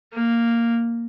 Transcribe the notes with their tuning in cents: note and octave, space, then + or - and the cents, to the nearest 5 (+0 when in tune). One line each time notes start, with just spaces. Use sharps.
A#3 -5